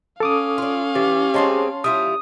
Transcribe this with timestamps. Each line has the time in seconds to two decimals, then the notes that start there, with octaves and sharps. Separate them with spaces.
0.20 C#4 A4 F5 D6 D#6
0.58 F4 D5
0.95 E3 G4
1.34 G#3 C4 G#4 C#5 A5 C6
1.84 G3 E4 F4 D#6